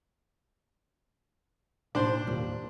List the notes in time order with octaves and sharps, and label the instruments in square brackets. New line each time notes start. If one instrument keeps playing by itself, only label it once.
[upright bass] A2 [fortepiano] D4 C5
[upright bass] D#2 F4